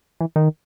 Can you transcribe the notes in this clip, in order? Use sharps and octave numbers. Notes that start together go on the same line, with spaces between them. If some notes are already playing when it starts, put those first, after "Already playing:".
E3
D#3